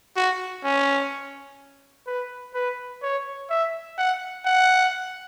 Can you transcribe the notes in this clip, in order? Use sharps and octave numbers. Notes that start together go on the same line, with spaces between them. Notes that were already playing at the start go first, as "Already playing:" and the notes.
F#4
C#4
B4
B4
C#5
E5
F#5
F#5